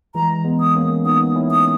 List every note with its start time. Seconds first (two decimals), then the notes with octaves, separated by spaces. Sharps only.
0.15 E3 G#3 A#5
0.45 G#3 B3
0.60 D#6
0.75 A#3 C#4
1.05 B3 D#4 D#6
1.35 C#4 E4
1.51 D#6